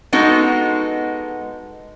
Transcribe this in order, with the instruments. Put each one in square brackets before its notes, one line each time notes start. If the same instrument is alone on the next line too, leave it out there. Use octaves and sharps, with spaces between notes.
[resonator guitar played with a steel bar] G#3 B3 D#4 F#4 A4